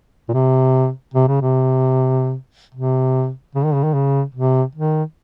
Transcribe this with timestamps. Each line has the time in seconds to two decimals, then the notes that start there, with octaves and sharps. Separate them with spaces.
0.29 A#2
0.33 C3
1.14 C3
1.28 C#3
1.42 C3
2.75 C3
3.55 C#3
3.65 D#3
3.74 C#3
3.84 D#3
3.94 C#3
4.35 C3
4.75 D#3